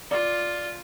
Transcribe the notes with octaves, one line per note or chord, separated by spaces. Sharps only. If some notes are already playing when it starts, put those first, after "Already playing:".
F4 D5